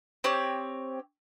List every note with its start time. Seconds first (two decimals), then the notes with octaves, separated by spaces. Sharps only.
0.24 C4 G4 C#5